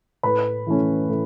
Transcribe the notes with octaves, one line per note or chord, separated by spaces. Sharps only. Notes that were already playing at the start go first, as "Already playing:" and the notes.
A2 B4 B5
E3 A3 C#4
A2